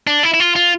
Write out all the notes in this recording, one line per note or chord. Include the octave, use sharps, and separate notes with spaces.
D4
E4
E4
F4
F4